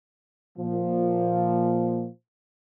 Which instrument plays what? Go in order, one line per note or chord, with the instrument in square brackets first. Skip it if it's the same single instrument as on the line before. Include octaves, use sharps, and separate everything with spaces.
[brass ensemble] A#2 F3